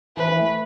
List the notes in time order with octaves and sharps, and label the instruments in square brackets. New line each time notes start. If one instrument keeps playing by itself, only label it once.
[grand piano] E3 [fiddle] B4
[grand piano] E3
A3